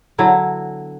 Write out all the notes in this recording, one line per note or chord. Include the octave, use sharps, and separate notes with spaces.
D3 F#3 B3 E4